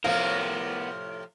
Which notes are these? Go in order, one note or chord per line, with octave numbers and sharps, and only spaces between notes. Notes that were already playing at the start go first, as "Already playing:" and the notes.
A2 C3 F3 B3 A#4 F5